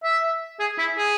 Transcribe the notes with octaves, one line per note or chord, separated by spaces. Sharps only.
E5
G#4
E4
G#4